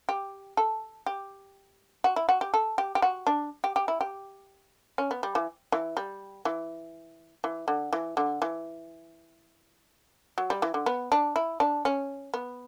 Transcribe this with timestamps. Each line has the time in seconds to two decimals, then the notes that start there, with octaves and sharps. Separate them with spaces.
0.09 G4
0.57 A4
1.06 G4
2.04 F#4
2.16 E4
2.29 F#4
2.41 G4
2.54 A4
2.78 G4
2.95 G4
3.02 F#4
3.27 D4
3.64 G4
3.76 G4
3.88 E4
4.01 G4
4.98 C#4
5.11 B3
5.23 G3
5.35 E3
5.72 E3
5.97 G3
6.45 E3
7.44 E3
7.68 D3
7.93 E3
8.17 D3
8.42 E3
10.38 F#3
10.50 G3
10.62 E3
10.74 D3
10.86 B3
11.12 D4
11.36 E4
11.60 D4
11.85 C#4
12.34 B3